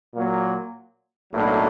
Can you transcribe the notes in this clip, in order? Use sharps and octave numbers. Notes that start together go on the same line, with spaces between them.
A#2 F#3 A#3
B1 A2 F#3 A#3 D4